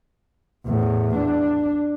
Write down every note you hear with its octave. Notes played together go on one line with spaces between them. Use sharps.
E2 A2
D4